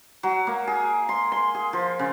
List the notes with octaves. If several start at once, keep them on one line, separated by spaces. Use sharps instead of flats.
F#3
A#3
G#4
C6
C6
G#4
F3
C#3